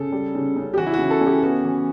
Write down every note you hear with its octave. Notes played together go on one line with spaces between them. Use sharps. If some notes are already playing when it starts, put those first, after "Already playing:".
Already playing: C#3 A4
G3
C#3
C#3
G4
E3 F#4
E4
C#3 F#4
A4
C#4
G4
B3 F#4
E3